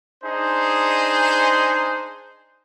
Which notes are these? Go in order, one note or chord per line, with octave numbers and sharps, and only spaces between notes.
D4 D#4 G#4 C5